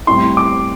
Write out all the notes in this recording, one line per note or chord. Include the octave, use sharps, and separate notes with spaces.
A2 G3 C4 E4 C6
D6